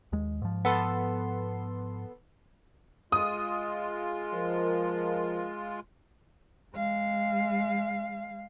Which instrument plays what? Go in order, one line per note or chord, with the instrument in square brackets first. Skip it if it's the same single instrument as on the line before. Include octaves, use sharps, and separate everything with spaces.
[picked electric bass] D#2 G#3
G#2 F3
[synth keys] B3 A4 C6
[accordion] G#3 F4 [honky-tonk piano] D#6
[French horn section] F3 A#4
[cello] G#3 F5